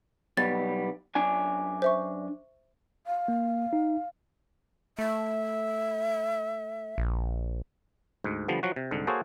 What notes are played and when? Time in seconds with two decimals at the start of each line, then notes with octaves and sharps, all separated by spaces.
0.37 B1 G3 B3 A6
1.15 F#2 D4 G#5
1.82 C5 E5 C#6
3.06 F5
3.28 A#3
3.73 D#4
4.98 A3 E5
6.98 A#1
8.24 D2 G#2
8.48 D3 F3 G3 B3
8.63 F3 F#3 F#4
8.76 C3
8.91 C2 G#2 D3
9.07 A#3 F#4 G#4 A4 C5 C#5